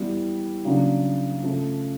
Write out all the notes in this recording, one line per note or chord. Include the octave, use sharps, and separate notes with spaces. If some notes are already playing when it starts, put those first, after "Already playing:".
Already playing: E3 G3 B3
C#3 F#3 A#3 D4
C#3 F3 A3